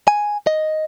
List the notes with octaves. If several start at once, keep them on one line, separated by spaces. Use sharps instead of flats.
G#5
D#5